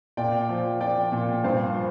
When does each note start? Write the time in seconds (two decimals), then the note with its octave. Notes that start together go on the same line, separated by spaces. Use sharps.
0.17 A#2 D5 G5
0.49 F3
0.80 F3 D5 G5
1.12 A#2
1.44 G2 C5 F5
1.75 F3